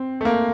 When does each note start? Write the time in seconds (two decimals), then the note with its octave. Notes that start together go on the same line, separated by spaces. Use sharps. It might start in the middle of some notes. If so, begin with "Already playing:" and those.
Already playing: C4
0.21 A3
0.25 A#3